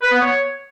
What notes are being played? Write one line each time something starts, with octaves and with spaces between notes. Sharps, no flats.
B4
B3
C#5